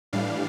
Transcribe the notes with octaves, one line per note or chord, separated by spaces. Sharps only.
A2 E3 G3 D4 F5